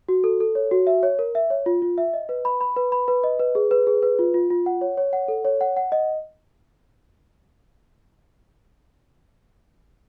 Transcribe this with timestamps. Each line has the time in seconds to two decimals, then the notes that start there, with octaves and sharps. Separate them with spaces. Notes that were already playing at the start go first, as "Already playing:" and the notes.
0.09 F#4
0.24 A4
0.40 A4
0.55 C#5
0.71 F#4
0.87 E5
1.03 C#5
1.19 A#4
1.35 E5
1.50 C#5
1.66 F4
1.82 F4
1.98 E5
2.14 D#5
2.29 B4
2.45 B5
2.61 B5
2.76 B4
2.92 B5
3.08 B4
3.24 D#5
3.40 B4
3.55 G#4
3.71 B4
3.87 G#4
4.02 B4
4.19 F4
4.34 F4
4.50 F4
4.66 F#5
4.81 C#5
4.97 C#5
5.13 F#5
5.28 A4
5.45 C#5
5.61 F#5
5.77 F#5
5.92 D#5